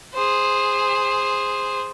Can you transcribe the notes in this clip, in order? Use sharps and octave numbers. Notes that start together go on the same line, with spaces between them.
G#4 C5